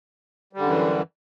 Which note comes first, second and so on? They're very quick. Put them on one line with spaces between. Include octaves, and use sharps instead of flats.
G3 D3 F#2 E3